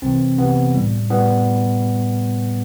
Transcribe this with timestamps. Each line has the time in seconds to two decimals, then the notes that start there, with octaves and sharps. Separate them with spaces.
0.02 C2 C3 E3 C4
0.38 C2 C3 E3 B3
0.74 A2 G3
1.10 A2 G3 B3